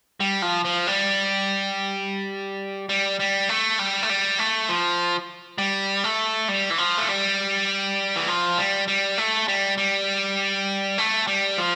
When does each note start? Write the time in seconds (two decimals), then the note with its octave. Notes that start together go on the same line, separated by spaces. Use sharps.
0.20 G3
0.42 F3
0.65 F3
0.87 G3
2.89 G3
3.20 G3
3.49 A3
3.79 G3
4.03 A3
4.09 G3
4.39 A3
4.69 F3
5.58 G3
6.04 A3
6.48 G3
6.70 E3
6.78 F3
6.98 A3
7.09 G3
8.16 E3
8.28 F3
8.58 G3
8.88 G3
9.18 A3
9.48 G3
9.78 G3
10.98 A3
11.27 G3
11.57 F3